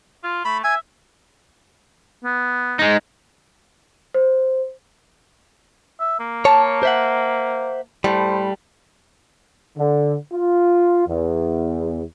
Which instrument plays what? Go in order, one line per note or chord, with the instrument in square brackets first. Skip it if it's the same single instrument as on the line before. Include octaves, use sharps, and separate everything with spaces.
[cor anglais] F4
[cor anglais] A3 [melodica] B5
[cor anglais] E5 [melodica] G#5
[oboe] B3
[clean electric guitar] G#3 D#4
[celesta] C5
[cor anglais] E5
A#3
[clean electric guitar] C#5 [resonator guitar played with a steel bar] A5
[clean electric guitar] C5 E5 F#5
[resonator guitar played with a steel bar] A2 [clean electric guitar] G3 [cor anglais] C5
[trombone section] D3
F4
E2